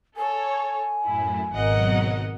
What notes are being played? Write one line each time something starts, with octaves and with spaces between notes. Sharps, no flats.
A4 C#5 G#5
F#2 A2 E4
G#1 B2 F#3 A#4 D#5 F#5